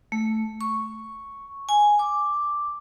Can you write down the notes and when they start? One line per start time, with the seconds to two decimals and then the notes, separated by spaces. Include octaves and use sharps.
0.12 A3
0.61 C#6
1.69 G#5
1.99 D6